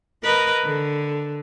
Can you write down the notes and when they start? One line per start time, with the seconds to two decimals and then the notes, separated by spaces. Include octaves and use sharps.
0.23 A#4 B4 D#5
0.64 D3